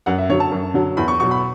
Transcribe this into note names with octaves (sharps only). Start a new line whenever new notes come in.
F#2 F#5
E5
D3 F#3 C#5
A5
F#2
D3 F#3
E2 B5
C#6
B2 F#3 C#6
B5